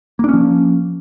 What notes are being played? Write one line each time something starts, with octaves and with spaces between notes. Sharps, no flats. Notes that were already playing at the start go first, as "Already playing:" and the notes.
F3 A#3 C#4 D4